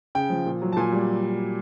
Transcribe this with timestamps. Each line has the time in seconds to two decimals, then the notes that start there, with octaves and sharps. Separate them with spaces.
0.15 C#3 G5
0.30 F3
0.46 A#2
0.62 F#3
0.72 A5
0.77 A#2 G#5
0.93 G3